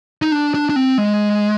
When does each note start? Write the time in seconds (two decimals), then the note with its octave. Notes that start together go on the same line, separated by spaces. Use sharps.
0.22 D#4
0.32 D4
0.54 D4
0.69 D4
0.76 C4
0.98 G#3